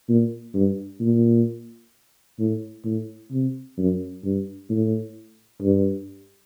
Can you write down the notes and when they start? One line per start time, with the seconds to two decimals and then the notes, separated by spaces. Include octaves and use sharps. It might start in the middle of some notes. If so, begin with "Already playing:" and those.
0.09 A#2
0.55 G2
1.00 A#2
2.39 A2
2.85 A2
3.31 C3
3.78 F#2
4.24 G2
4.70 A2
5.62 G2